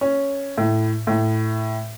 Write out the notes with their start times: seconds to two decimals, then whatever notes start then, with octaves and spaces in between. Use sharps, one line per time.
0.01 C#4
0.58 A2
1.07 A2